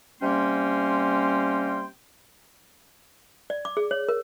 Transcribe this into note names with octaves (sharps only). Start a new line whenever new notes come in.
C3 G3 A#3 C#4 G5 C6
D5
D6
G#4
C#5
A#4